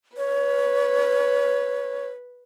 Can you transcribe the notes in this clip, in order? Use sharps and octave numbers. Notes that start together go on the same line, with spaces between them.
B4 C#5